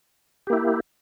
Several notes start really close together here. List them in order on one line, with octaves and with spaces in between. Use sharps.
G4 A#3 E4